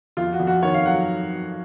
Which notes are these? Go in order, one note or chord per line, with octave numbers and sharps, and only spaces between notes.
F2 F4
F#4
F2
F#4
D#3 C#5
F5
F#3 F#5